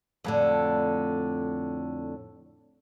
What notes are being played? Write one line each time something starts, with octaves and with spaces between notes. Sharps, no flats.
F2 A2 D3